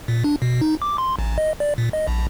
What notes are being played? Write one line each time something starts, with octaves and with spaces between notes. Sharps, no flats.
A#2
D4
B2
D#4
D6
C6
A1
D#5
D5
A#2
D#5
A#1